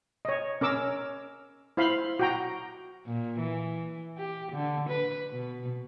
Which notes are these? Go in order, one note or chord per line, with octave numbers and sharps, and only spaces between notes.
C#5 D#5
C#4 A#4 D6 E6
E4 C5 F5 B5 C6
F#4 G5 A#5
A#2
E3
G4
D3
B4
B2